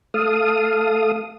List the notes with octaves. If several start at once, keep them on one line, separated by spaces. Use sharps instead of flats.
A3 A4 F5 D#6